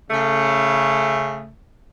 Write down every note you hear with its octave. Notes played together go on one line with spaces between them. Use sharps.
C#3 A3